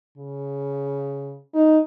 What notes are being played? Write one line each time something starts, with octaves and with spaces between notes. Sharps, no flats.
C#3
D#4